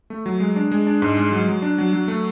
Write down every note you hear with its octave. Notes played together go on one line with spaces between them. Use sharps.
A3
F#3
G#3
D4
G#3
D4
G#2
G#3
F#3
F#3
D4
F#3
F#3
A3